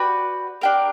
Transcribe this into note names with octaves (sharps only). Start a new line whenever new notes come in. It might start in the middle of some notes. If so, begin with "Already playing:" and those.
Already playing: F#4 B4 D5 G5
D4 G4 A#4